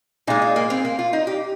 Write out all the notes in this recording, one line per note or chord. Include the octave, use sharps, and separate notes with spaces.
A#2 G#3 D#4
F4
A#3
C4
A#3
F4
D#4
G4